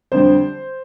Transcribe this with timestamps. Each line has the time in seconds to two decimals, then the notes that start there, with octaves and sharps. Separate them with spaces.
0.12 F2 D3 G3 C5